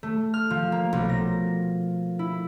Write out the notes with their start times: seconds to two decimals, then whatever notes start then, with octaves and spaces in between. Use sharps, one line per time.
0.03 A3
0.34 F6
0.50 F3
0.72 A#3
0.93 B1
1.09 A#6
2.19 E4